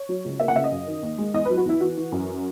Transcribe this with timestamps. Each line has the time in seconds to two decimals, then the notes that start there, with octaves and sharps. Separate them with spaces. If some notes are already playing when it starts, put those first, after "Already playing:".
Already playing: C#5
0.09 F#3
0.25 C#2
0.40 A#3 E5
0.48 F#5
0.55 C#3 E5
0.64 D#5
0.72 F#2
0.87 D#3
1.03 D#2
1.18 G#3
1.34 E2 D#5
1.45 F#3 B4
1.57 F#4
1.65 E2 E4
1.81 E3 F#4
1.97 E3
2.12 F#2